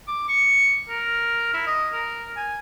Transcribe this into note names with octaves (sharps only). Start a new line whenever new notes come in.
D6
C#6
A#4
E4
D#5
A#4
G#5